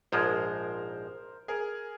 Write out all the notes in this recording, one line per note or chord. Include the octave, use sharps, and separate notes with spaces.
A#1 G#2 F3 G#3 A#4 C5
G#4 A#4